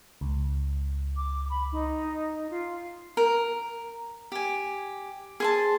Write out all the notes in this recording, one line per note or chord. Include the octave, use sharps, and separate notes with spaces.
C#2
D6
B5
D#4
F4
A#4
G4 G#5
G#4 C5 A5